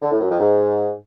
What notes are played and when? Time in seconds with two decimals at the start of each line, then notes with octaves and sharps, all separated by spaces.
0.02 D3
0.11 A2
0.21 F#2
0.30 F2
0.40 G#2